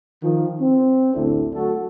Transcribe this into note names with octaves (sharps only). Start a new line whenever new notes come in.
D#3 F3
C4
A1 D2 D4 E4 A4
F#3 A3 F#4 A4